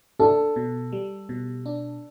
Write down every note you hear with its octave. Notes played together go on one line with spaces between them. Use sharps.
D4 A4
B2
G3
B2
D4